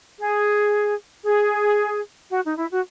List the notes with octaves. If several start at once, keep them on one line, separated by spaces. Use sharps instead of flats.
G#4
G#4
F#4
D#4
E4
F#4